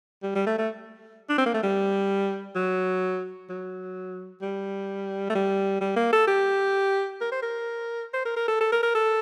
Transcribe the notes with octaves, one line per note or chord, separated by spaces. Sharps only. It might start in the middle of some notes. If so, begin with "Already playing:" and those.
G3
G3
A3
A3
D4
C4
A#3
A3
G3
F#3
F#3
G3
A3
G3
G3
A#3
A4
G4
A#4
C5
A#4
C5
A#4
A#4
A4
A4
A#4
A#4
A4